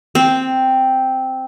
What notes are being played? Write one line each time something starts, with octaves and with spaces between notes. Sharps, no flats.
C4